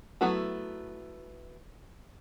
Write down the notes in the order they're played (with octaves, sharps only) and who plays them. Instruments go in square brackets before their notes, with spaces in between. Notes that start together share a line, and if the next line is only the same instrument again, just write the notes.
[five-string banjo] F#3 A3 B3 E4 F#4